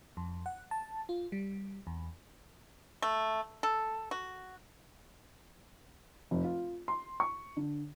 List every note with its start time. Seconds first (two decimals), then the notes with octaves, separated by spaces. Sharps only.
0.17 F2
0.46 F#5
0.71 A5
1.09 F4
1.32 G3
1.87 E2
3.02 A3
3.63 A4
4.11 F#4
6.31 F1
6.44 F4
6.88 C6
7.20 C#6
7.57 D3